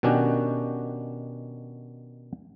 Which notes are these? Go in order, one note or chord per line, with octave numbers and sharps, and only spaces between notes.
B2 D#3 C#4 D4 F#4 G4